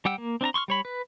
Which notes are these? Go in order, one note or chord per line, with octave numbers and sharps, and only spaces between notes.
G3 G4 F#5 G5 E6
A#3
C4 D4 A5 A#5
C6 C#6 E6 F6
G3 C#5 B5
B4